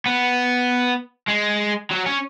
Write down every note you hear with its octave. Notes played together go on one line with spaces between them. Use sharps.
B3
G#3
F#3
C#4